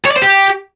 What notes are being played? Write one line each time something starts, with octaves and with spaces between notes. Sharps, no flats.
C#5
D5
C5
G4